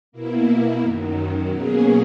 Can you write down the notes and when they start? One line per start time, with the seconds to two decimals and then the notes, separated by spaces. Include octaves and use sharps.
0.12 B2 A#3 E4
0.80 F#2 D#3 F#3
1.48 B2 F#3 A#3 C#4 G#4